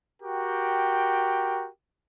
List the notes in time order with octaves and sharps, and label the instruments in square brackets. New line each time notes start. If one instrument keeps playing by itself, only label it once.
[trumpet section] F#4 G4 A#4 G5